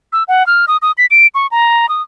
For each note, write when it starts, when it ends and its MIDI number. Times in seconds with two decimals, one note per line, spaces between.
0.13 0.23 88
0.28 0.46 78
0.47 0.65 89
0.68 0.77 87
0.82 0.92 87
0.98 1.06 95
1.11 1.27 98
1.35 1.47 85
1.51 1.89 82
1.89 2.02 87